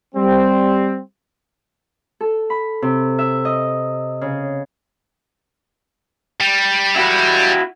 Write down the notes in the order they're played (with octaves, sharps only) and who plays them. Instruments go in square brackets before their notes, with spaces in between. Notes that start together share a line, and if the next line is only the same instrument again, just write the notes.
[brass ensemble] G3 C4
[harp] A4
B5
C3
E5
D#5
C#3
[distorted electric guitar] G3
[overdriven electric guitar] E4 F#4